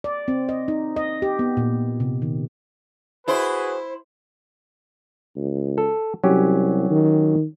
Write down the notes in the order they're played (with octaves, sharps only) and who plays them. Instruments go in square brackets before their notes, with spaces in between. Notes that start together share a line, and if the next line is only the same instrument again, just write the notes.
[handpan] D5
C4
D#5
D#4
D#5
G4
B3
A#2
C3
D#3
[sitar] E4 C5 [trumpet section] F#4 G#4 B4
[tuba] C#2
[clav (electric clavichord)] A4
[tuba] C2 [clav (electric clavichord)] F#3 C#4 G4
[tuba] D#3